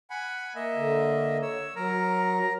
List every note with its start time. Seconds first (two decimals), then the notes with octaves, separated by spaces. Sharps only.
0.10 F#5 G#5 B5
0.55 A#3 D#5 E5
0.76 D3
1.42 C#5 E6
1.76 F#3 A#4 A#5